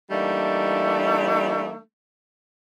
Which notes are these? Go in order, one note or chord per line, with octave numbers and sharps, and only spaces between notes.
E3 G3 A3 A#3 D4 D#4